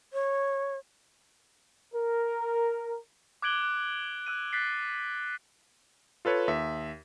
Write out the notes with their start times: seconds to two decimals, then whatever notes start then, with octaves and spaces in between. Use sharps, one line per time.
0.13 C#5
1.94 A#4
3.42 D6 F#6 G#6 D7 F#7 G7
3.63 F#6
4.26 E6 F#6 D#7
4.53 F#6 A6 B6 C7
6.25 F4 A4 B4 C#5
6.48 D#2 E5